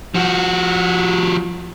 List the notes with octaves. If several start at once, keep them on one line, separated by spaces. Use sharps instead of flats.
F3 F#4